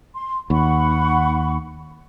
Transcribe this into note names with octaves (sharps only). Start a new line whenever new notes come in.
C6
D#2 F#5 B5 C#6